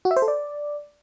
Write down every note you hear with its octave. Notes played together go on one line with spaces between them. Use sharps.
F#4
E5
C5
A4
D5